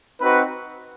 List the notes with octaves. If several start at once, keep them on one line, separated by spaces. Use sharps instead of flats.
C4 D#4 F#4 B4